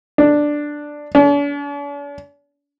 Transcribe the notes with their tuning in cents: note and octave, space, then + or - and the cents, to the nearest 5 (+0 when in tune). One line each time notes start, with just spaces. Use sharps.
D4 +5
D4 -45